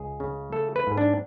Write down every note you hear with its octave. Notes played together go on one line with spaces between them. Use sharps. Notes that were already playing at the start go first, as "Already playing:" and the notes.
Already playing: C#2 G#4
C#3
A3 A4
B4
G#2
D4